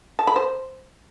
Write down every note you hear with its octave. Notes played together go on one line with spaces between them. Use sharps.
A5
B5
C5